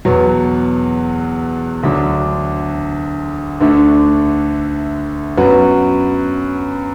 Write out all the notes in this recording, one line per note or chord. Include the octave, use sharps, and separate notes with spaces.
E2 B2 F#3 B3
D2 D3 F#3 D4
D2 D3 A3 D4
F#2 F#3 B3 F#4 B4